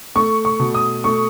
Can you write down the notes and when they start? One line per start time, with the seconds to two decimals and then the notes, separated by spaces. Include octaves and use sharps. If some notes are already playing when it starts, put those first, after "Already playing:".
0.16 A3 C#6
0.45 C#6
0.59 B2
0.74 D#6
1.04 A3 C#6